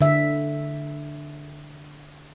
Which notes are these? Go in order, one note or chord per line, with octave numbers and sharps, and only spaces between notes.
D3 E5